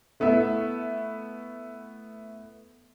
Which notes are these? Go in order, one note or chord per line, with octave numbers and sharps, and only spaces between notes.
A3 B3 E4 E5